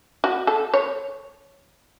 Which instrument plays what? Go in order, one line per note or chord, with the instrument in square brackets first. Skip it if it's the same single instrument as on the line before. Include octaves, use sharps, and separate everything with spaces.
[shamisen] F#4
A4
C#5